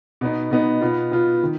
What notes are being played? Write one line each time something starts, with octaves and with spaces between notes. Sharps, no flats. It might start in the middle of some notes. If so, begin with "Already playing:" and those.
B2 B3 D#4
B2 B3 D#4
B2 B3 F4
B2 B3 F4
D#3